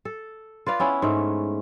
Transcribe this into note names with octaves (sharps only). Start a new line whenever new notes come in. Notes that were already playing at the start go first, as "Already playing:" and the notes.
A4
F4 B4 D5 F5
B3 C#4 E4
G#2 A3